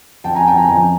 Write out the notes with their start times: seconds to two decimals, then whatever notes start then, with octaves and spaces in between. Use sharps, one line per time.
0.24 F2 G5 A5
0.35 G#5 A#5
0.47 F2 G5 A5
0.57 G#5 A#5
0.69 F2 G#5 A#5